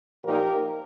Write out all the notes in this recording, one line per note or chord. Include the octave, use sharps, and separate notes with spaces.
A#2 F3 A#3 D#4 G4 A#4